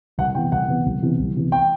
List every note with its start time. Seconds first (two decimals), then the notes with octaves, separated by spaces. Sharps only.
0.18 C2 F#5
0.35 C3 E3 B3 G5
0.52 C2 F#5
0.68 C3 E3 B3
0.86 C2
1.02 C3 E3 B3
1.19 C2
1.36 C3 E3 B3
1.52 G5